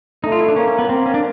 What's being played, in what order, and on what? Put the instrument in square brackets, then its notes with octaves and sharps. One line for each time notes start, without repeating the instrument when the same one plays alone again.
[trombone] A3 [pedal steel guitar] D#4
[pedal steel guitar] F4
E4
D4
[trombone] A#3 [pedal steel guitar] C#4
[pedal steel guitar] C#4
B3
[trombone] A#3 [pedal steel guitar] C4
[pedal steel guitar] C#4
D4